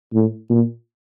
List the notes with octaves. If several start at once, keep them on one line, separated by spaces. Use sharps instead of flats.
A2
A#2